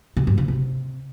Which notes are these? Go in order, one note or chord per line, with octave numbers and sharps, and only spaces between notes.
C3
G2
C#3
C3